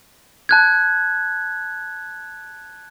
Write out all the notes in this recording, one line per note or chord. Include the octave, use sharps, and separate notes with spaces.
A5 F#6 G#6